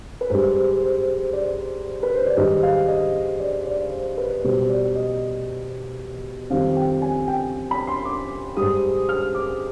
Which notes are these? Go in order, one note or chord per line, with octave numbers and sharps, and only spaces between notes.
B4
G#2 G3 C5
C5
D5
B4
C5
D5
G#2 D#3 G3 D#5
F5
D#5
D5
D5
C5
B4
B2 G3 C5
D5
D#5
F2 D#3 G3 F5
G5
G#5
G5
B5
C6
D6
G#2 G3 D#6
F6
D6